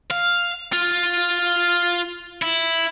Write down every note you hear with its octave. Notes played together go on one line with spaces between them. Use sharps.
F5
F4
E4